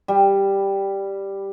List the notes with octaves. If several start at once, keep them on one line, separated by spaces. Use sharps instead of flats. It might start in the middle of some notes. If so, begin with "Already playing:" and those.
G3